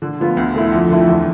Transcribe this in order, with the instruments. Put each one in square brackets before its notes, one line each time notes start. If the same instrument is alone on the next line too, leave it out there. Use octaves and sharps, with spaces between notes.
[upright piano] D3
F3 B3 F4
D2
D3 A3 E4
F2
D3 F3 A3 E4
E2